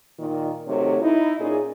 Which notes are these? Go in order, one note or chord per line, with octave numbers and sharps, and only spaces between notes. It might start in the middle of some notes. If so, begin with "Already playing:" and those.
A#2 D#3
C3 D#3 F#3 A3 C#5
D#4 E4
A#2 C#4 D#4 G#4